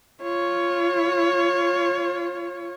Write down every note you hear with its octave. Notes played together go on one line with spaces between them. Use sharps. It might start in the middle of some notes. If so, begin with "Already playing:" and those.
F4 C#5